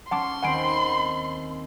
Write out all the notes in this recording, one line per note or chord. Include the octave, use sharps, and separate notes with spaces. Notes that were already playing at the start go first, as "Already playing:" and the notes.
C#4 F#5 A5 C6 D6
D#2 C4 F#5 G#5 B5 D7